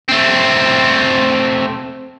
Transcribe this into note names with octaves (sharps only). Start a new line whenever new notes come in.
A3 C4